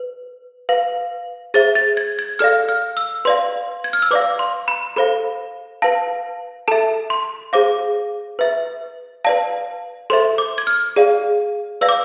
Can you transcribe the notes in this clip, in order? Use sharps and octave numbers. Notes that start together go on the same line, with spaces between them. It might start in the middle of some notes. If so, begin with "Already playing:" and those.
Already playing: B4
B4 F5
G#4 C5 E5 A6
A6
G#6
G#6
A4 D5 F5 F6
F6
E6
B4 D5 F5 C6
G#6
F6
E6
B4 D5 F5 D6
C6
B5
A4 C5 F5 B5
B4 F5 A5
A4 E5 A5
C6
G#4 C5 F5 D6
B4 E5
B4 D5 F5 A5
A4 C5 E5 C6
D6
G#6
F6
G#4 D5 F5
B4 D5 F5 E6
D6